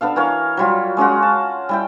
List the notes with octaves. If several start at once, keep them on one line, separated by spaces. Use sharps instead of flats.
B3 D4 A4 F5
E3 A#4 C#5 F5
F#3 G3 F4
G#3 C#4 F4 F#4
A5
G3 E4 G5